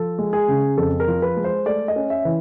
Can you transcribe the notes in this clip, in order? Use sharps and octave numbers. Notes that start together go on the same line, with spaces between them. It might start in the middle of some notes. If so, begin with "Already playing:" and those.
Already playing: F3 A4
G#3
G#4
C#3
F2 A4
A#4
F3
B4
G#3
C5
A3 D5
D#5
C#4
E5
E3